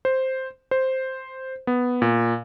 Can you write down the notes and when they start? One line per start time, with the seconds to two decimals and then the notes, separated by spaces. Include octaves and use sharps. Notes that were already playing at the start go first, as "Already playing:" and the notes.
0.05 C5
0.71 C5
1.67 B3
2.02 A#2